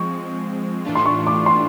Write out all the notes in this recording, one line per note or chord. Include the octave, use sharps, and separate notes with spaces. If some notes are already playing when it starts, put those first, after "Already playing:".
Already playing: F3 G#3 C4 C#6
A2 E3 A3 D4 F4
C6
C#6
D6
C6